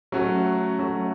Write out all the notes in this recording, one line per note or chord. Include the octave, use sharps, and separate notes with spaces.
F#3 A3 C#4 F#4
F#3 A3 C#4 F#4